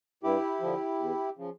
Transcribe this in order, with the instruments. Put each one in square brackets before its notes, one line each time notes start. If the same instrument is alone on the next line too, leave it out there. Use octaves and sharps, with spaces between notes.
[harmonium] G2 E4 G4
D3 F3
E2
C#3 F3